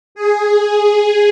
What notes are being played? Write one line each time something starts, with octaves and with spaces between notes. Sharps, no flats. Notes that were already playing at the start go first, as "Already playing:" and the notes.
G#4
G#4